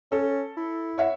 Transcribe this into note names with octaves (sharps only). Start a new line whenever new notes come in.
C#4 A4
E4
C#5 E5 F#5